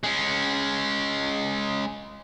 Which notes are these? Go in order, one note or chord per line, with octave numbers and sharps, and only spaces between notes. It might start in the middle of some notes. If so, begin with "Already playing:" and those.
G#3 C#4